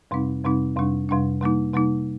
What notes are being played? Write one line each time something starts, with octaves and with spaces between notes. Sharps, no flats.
F2 C3 G3 C4 D#4
F2 C3 G3 C4 D#4
F2 C3 G3 D4
F2 C3 G3 D4
C3 G3 A#3 D#4
C3 G3 A#3 D#4